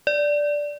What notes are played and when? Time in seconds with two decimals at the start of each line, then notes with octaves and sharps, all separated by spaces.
0.07 D5